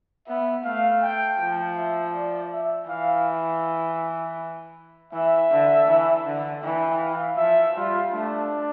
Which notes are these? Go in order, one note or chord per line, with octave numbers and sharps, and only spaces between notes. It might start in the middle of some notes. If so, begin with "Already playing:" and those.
B3 E5
A3 F5
G5
F3
E5
D5
E5
E3 F5
E3 E5
D3
E3
D3
E3 G5
F5
F3 E5
G3 F4
A3 D4